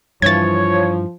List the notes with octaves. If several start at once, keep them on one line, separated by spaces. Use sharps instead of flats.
G2 E3 F3 C#5 G#6 A6